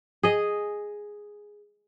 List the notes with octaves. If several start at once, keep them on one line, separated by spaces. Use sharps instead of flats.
G#4 D#5